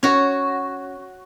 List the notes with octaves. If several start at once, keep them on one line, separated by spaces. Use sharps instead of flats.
C#4 F#4 C#5 F#5